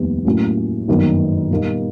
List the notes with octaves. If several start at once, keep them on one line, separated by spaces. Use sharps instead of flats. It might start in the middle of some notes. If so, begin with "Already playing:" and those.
Already playing: F1 D#2 D#3 G3 B3
A2 F#3 A#3 C#4
G1 F#2 D#3 F#3 A#3
A#2 G3 A#3 D#4